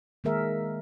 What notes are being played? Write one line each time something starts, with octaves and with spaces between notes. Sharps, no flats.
D#3 G#3 A#3 G#4 A#4 E5